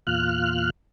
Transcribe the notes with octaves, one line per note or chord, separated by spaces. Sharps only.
E2 A#2 F4 F6 F#6